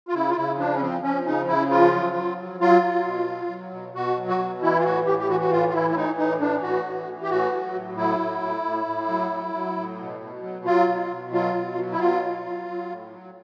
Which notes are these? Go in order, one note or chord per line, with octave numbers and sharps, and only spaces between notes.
F4
C#3 E4
F4
C#3 E4
F3 D4
C#4
F3 C4
F3 C#4
C#3 D#4
C#3 E4
F3 F4
F#3
F#3
F#3
F#3 F4
F#3
B2
F#3
F#3
B2
B2 F#4
F#3
F#4
B2
E3 E4
F4
A2 F#4
A2 G4
G4
E3 F#4
F#4
A2 F4
F4
E3 E4
E4
E3 D#4
A2 D#4
E3 D4
A2 F#4
E3
E3
G4
A2 F#4
F#3
A2
F#3 E4
A2
A2
A2
A2
F#3
F#3
F#3
A2
B2
B2
F#3
F#3 F4
B2
B2
F#3 F4
B2
F#3
E4
B2 F4
F#3
F#3
F#3
A2
F#3